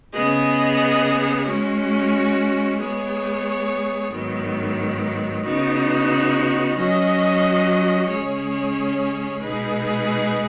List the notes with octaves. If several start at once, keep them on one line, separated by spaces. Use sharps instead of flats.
C#3 B3 G#4 D#5
G#3 C#4 F#4
G#3 B3 G#4 C#5
G#2 D#3 F#3 B3
C#3 B3 D#4 F#4
F#3 C#4 F#4 D#5
C#3 G#3 C#4 G#4 C#5
B2 G#3 D#4 G#4 B4